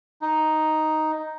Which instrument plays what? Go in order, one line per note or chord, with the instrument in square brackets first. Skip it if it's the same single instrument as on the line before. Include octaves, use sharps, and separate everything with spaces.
[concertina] D#4